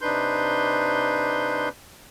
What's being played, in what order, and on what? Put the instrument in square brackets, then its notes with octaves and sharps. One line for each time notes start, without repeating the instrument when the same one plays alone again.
[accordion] C3 D4 D#4 B4 C6 G6